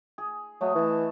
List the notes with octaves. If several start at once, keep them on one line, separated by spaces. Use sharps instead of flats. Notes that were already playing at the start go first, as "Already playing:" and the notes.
G#4
F#3 A3 G#4 D#5
E3 A3 A5